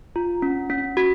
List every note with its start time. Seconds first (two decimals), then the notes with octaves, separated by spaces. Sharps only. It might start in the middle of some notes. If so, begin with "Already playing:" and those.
0.16 F4
0.42 C#4
0.70 C#4
0.97 F#4